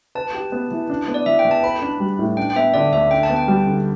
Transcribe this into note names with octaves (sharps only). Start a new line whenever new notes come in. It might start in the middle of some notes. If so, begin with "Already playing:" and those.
B4 A5
G4
B3
E3
D4
B3
D5
E3 E5
G5
E2
A5
B4 B5
D4
G3
A2
D4 G5
G5
B3 E5
D3 D5
D2 E5
D4 G5
A5
B3
G5
G3
D3